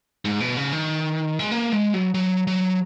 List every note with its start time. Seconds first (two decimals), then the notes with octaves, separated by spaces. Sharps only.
0.25 G#2
0.40 B2
0.57 C#3
0.72 D#3
1.39 G#3
1.51 A#3
1.72 G#3
1.94 F#3
2.14 F#3
2.47 F#3